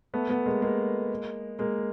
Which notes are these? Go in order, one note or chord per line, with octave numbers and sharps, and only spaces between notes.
A3 B3
A3 B3
G#3 A#3
G#3 A#3
G#3 A#3